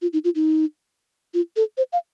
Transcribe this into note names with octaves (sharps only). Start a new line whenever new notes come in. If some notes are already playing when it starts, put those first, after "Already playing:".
F4
D#4
F4
D#4
F4
A4
C5
F5